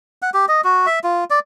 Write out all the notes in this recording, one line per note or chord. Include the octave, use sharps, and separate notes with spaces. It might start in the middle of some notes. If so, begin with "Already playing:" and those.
F#5
G4
D#5
F#4
E5
F4
D5